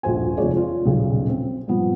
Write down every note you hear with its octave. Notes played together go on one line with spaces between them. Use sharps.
D#1 A#1 F#4 C5 G#5
F1 F3 G#3 C#5 D5
F4
D#1 B1 C#3
C4
G2 A#2 F3 B3